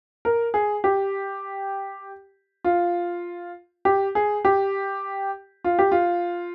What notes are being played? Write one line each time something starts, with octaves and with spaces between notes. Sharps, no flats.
A#4
G#4
G4
F4
G4
G#4
G4
F4
G4
F4